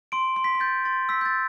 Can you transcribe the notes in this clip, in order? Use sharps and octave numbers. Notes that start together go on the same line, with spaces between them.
C6 D7
C6
B6
B6
G6 A6
C6 A6
E6 B6
G6
A6